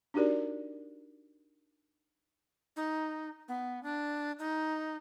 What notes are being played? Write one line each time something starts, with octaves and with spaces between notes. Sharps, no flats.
D4 D#4 F#4 G4 A#4 D5
D#4
B3
D4
D#4